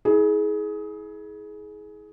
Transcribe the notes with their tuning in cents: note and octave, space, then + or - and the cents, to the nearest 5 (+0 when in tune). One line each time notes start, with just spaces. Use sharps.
E4 -35 G#4 +20